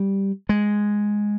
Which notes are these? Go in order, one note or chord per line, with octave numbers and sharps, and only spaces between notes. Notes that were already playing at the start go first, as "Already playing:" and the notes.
Already playing: G3
G#3